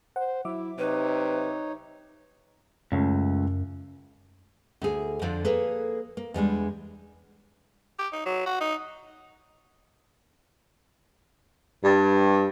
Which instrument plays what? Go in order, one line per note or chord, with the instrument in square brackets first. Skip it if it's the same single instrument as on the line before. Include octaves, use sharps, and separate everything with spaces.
[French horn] C5 [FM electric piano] F#5
[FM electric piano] F#3 E5 D6 [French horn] E4
[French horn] C3 [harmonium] D#4 C#5 [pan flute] B4
[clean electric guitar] C#2 [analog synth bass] F#2 [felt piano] A3 C#4
[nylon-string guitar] D2 G#4
F2 D3 F3 D4 D5
A#3 G#4 A4 B4
A#3
E2 G3 G#3 D4
[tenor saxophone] G4
D#4
F#3
F#4
D#4
[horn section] G2